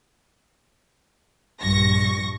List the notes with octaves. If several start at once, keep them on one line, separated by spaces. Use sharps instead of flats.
A#1 G2 C#6 A#6